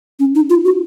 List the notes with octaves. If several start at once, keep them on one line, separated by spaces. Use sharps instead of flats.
C#4
D#4
F4
F#4